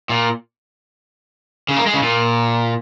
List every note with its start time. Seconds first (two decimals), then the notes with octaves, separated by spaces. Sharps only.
0.09 A#2
1.68 C#3
1.76 A#3
1.86 G#3
1.94 C#3
2.03 A#2